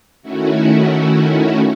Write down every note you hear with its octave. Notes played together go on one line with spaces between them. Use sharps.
D#3 A3 C#4 E4 F#4